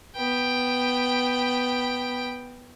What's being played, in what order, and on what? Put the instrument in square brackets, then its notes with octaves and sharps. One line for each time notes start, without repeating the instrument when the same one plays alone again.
[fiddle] B3 G5